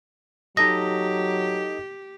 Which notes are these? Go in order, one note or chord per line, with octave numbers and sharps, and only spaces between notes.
F#3 D#4 G4 A4 D#5 A#6